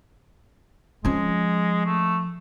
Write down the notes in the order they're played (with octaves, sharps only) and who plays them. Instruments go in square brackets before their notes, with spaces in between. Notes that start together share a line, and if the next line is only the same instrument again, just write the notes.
[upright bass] F3 C#4 [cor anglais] G#3
[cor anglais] A3